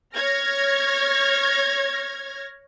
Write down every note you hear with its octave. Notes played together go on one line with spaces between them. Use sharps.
C#5 F6 G#6 A#6